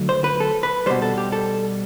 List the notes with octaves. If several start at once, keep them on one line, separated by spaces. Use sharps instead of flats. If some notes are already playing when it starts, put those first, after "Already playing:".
Already playing: D3 F#3 A3
C5
B4
A4
B4
B2 G3 C5
A4
G4
A4